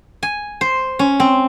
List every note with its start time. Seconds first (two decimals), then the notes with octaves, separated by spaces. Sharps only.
0.23 G#5
0.61 C5
0.99 C#4
1.20 C4